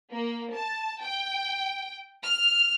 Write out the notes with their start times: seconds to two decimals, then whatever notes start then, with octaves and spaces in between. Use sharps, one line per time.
0.11 A#3
0.53 A5
1.02 G5
2.22 F6